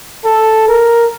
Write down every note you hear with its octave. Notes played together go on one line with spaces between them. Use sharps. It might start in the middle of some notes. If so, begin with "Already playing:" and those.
A4
A#4